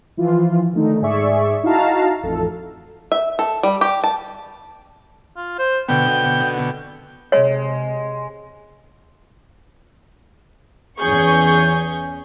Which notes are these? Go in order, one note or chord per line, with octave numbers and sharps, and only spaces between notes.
E3 F3 F4
D3 D#3 A3 D#4
G#2 G#4 D5 E5 C#6
D#4 E4 F#4 F5 A5 A#5
A1 F2 A4
E5
A4
G3
G4
A5
F4
C5
B2 D3 B3 G5
C3 G#3 C#5
E2 C#4 G#4 C#6 G6